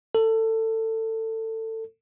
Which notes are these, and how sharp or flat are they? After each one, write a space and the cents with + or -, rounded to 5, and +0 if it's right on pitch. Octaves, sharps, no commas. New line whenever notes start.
A4 +25